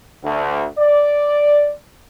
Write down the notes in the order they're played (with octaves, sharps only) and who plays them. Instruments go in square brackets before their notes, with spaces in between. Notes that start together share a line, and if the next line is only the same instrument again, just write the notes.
[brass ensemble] D2
D5